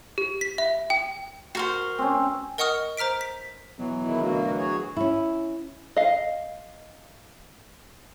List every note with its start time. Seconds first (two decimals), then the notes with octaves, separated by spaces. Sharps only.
0.18 G4
0.41 B6
0.58 E5
0.90 G5
1.55 F#4 A#4 C5
1.99 C4 C#4
2.58 A#4 D#5 F#5 C#6 D#6 F6
2.97 C5 A#5 F6 B6 D7
3.21 B6
3.79 B2 E3 F#3
4.04 D#3 G#3 E4
4.22 D2 B2 A#3 F#4
4.58 F#4 G#4 C#5
4.97 C#4 E4
5.96 D#5 F5